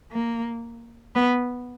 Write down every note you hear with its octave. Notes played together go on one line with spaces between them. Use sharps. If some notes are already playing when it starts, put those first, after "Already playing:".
A#3
B3